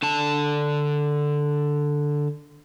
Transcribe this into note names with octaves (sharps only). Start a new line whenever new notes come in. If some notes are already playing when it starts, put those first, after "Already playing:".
D3 A5